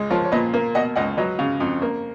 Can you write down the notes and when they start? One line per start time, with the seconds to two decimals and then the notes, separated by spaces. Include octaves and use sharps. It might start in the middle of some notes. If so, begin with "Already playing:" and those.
Already playing: C#2 G#3
0.10 F3 A#4 C#5
0.25 C#5
0.32 A#2 B4 D#5
0.54 A#3
0.75 B2 D#5 F#5
0.96 C#2 D#5 F#5
1.17 F#3 B4 D#5
1.39 C#3
1.60 F2
1.82 A#3